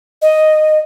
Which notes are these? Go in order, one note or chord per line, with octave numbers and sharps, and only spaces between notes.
D#5